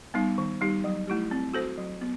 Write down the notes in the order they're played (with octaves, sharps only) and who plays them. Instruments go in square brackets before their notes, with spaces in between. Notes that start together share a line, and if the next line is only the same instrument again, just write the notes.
[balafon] G3 B3 D#4
D#3
G3 D#4 G4
F#3
A3 E4 G4
C4
F#4 A4 C5
F#3
B3